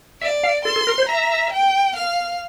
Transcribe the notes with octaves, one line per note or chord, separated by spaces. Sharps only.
D5 E5
F5
A4 C6
A4
A#4
C5
E5 A#5
G5
F5